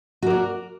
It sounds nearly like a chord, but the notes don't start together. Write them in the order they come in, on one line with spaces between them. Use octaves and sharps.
F#4 A#4 D5